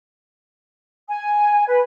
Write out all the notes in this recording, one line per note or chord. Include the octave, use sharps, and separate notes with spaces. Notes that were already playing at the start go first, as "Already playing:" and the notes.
G#5
B4